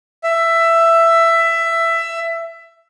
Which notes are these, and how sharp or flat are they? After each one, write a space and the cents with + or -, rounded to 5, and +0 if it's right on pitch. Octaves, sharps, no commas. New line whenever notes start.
E5 +15